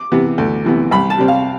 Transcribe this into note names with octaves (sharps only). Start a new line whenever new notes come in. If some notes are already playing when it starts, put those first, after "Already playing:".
Already playing: D6
C3 E3 B3
D2
C3 E3 B3
C2 B5
A5
C3 G3 C4
F5